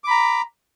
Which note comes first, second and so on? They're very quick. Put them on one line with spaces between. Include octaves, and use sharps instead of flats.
D6 B5 A#5